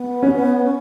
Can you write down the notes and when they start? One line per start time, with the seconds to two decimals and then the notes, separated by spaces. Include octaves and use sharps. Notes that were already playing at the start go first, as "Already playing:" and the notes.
Already playing: B3
0.23 C#4
0.65 C#4